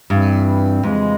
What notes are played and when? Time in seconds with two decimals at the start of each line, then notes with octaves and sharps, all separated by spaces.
0.10 G2 E3 G3 C4 E4
0.83 F2 C#3 E3 G#3